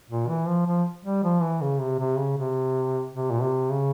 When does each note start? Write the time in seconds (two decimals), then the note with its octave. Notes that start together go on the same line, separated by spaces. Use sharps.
0.10 A#2
0.28 E3
0.47 F3
0.66 F3
1.05 G3
1.24 F3
1.42 E3
1.61 C#3
1.80 C3
1.99 C3
2.18 C#3
2.38 C3
3.14 C3
3.31 A#2
3.42 C3
3.71 C#3